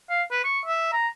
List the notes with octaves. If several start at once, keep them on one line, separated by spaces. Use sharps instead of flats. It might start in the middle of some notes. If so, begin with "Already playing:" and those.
F5
B4
C#6
E5
A#5